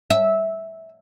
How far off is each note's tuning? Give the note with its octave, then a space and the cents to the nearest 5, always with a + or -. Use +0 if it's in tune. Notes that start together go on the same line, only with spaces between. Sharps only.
E5 -15